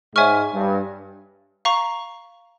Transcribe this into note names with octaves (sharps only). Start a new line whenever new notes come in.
G#2 C#5 E5 G#5 C#6 F6
G2
F5 A#5 C#6